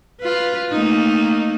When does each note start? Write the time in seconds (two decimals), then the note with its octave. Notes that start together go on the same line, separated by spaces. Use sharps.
0.21 F4 B4
0.72 A3 A#3 D#4